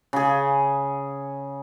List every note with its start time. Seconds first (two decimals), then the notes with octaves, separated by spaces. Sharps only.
0.13 C#3 G#4